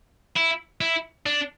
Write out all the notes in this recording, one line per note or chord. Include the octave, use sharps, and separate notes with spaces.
E4
E4
D4